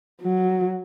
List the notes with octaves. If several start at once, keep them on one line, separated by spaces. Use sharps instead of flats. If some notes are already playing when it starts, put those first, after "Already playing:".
F#3